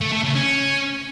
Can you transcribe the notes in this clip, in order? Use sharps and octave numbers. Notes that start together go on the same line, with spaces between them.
A3
A3
C#3
C#4